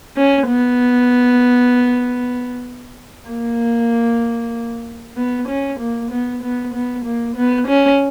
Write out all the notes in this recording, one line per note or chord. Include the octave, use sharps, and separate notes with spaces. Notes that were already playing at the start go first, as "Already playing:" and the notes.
C#4
B3
A#3
B3
C#4
A#3
B3
B3
B3
A#3
B3
C#4